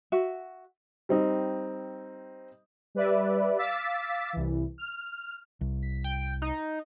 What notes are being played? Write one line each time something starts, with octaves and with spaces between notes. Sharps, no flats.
F#4 E5
G3 C4 D#4
G3 B4 D5 E5
F5 D6 E6 A6 B6
C2 E3
F6
C2
B6
G5
D#4